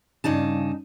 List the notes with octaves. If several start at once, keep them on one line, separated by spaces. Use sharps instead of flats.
G2 C#3 D#4 A5